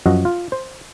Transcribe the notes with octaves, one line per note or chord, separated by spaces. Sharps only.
F#2 F3 F#4 D#5
F4
C5